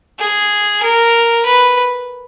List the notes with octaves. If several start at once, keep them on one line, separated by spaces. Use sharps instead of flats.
G#4
A#4
B4